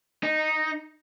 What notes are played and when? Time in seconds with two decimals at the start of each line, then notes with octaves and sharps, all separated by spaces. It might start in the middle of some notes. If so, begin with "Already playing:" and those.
0.23 D#4